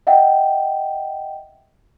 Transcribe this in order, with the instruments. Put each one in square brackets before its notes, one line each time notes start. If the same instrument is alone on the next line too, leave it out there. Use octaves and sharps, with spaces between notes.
[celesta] D#5 E5 F#5 G5